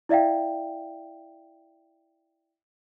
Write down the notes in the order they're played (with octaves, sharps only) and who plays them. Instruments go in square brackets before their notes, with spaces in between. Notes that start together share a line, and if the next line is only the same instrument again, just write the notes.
[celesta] E4 D5 E5 F5 G5